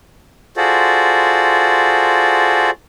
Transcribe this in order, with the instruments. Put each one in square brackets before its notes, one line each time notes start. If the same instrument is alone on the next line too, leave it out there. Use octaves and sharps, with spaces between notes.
[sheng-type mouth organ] F4 F#4 G#4 A4 C5 D5